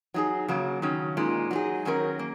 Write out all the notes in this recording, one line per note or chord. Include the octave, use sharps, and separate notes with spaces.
F#3 D#4 G#4
C#3 F#3 A#3
D#3 F#3 C#4
A#2 G#3 D#4
F#3 D#4 G#4
D#3 F#3 C#4 A#4
A#3